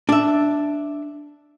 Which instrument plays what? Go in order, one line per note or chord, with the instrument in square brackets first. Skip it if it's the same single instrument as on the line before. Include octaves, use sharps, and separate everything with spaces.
[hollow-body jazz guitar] D4 E5